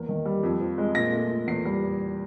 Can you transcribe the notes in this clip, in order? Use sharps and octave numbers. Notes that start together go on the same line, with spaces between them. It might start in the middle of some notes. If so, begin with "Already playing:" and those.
Already playing: E2 A#3
D#3
G3
F2
F3
G#3
A#2 A#6
A3
A#2
E2 C7
G3